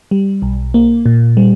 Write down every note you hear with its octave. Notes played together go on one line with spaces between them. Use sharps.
G3
B1
A#3
A#2
G3